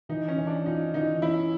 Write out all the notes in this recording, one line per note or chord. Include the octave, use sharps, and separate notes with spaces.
E3 D#4
C#4
E3
D4
D#4 F4
E3 D#4
C#4 E4